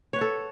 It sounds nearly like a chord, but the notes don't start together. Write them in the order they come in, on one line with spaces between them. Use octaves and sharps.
C#5 B4 F#5 A4